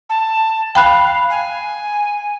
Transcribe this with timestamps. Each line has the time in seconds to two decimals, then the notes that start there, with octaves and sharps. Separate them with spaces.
0.09 A5
0.75 F5 G5 B5 F#6
1.30 G#5